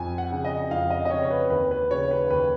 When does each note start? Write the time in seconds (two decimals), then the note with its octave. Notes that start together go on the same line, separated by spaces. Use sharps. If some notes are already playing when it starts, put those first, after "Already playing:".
Already playing: F2 G#5
0.18 F#5
0.32 C#3
0.45 D#5
0.71 F2 F5
0.90 D#5
1.05 D#5
1.10 C#3 C#5
1.24 C#5
1.31 B4
1.50 D#2 B4
1.71 B4
1.90 C#3 C#5
2.11 B4
2.30 D#2 B4